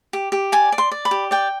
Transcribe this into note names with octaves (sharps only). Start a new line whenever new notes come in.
G4
G4
D5 G#5
D5
C6
D5
B5
G4
D5 G5